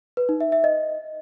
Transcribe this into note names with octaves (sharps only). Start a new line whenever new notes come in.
B4
D#4
E5
E5
D#5